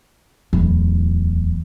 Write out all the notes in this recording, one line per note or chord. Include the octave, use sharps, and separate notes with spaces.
D1 E2